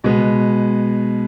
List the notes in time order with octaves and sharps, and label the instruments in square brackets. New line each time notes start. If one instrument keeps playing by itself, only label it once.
[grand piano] B2 G#3 B3